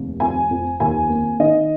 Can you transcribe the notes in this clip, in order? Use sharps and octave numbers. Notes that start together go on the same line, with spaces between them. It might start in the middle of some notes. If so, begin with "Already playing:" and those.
Already playing: F1 D#2
F2 G#5
F2
D#2 G#5
A#3
D#3 D#5